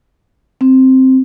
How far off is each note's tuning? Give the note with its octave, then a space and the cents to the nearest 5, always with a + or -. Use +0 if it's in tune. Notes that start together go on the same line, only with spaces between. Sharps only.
C4 +0